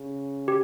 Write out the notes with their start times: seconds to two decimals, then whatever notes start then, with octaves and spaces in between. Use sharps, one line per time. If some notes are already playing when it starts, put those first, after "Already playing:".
Already playing: C#3
0.48 G4